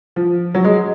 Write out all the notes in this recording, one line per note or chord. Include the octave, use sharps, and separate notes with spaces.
F3
F#3
G#3